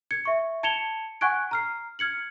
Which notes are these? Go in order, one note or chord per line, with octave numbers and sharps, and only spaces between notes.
G#6 C#7
E5 C#6
A5 G#6 C#7 E7 F7 G7
F#5 G#5 C#6 F#6 G#6 D7
A#5 F6 C7
F6 G#6 C#7 F#7